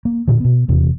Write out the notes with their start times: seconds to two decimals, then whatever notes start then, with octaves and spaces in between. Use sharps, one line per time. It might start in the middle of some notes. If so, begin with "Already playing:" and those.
0.05 A#3
0.28 A#2 D3
0.40 B2 B3
0.68 D#1 E2 C3